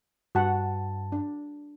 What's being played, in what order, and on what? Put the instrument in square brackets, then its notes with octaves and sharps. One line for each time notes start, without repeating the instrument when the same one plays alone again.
[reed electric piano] G2 A5 [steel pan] F#4 F#5
[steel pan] D4